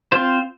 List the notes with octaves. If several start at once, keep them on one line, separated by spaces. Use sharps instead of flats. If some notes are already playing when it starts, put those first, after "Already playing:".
C4 F4 C5